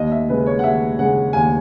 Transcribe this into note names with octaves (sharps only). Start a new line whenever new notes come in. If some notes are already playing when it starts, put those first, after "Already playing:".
Already playing: D#2 D#5
E5
C#3 G#3 B4
C#5
F#5
D#2 E5
C#3 G#3 F#5
D#2 G#5